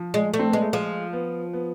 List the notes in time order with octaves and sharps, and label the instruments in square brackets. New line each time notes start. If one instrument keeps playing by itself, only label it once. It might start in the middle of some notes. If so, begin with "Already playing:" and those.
Already playing: [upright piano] F3
[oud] G#3
A3
[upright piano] C4
[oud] G#3 [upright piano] B3
[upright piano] A3
[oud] F3 [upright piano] G#3
[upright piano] B3
B3